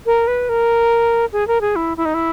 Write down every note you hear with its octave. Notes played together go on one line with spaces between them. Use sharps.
A#4
B4
A#4
G#4
A#4
G#4
E4
E4
D#4
E4